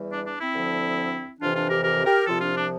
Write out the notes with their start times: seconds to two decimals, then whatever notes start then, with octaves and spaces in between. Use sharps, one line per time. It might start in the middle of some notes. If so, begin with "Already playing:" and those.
Already playing: E2 E3 G3
0.12 D4
0.25 D4
0.41 C4 E4
0.54 D2 D3 F3
1.40 F2 C3 E3 D4 F4
1.55 D4 F4
1.70 G4 A#4
1.84 G4 A#4
2.06 G4 A#4
2.27 C2 C3 F3 F4 A4
2.41 D4 F4
2.56 D4